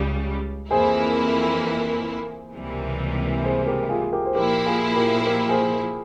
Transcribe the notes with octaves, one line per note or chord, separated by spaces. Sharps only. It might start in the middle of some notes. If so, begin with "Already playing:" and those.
Already playing: C#2 C#3 G3
F2 E3 A#3 E4 G#4 C5
C#2 C3 E3 G3 A#3
G#4 C5
G4 A#4
F4 G#4
G4 A#4
C5
A#2 F3 A#3 E4 G4 A#4
F4 G#4
G4 A#4
G4 A#4
G#4 C5